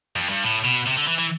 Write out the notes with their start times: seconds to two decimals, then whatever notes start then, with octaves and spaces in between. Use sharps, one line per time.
0.16 F2
0.29 G2
0.43 A2
0.64 B2
0.86 C3
0.97 D3
1.07 E3
1.18 E3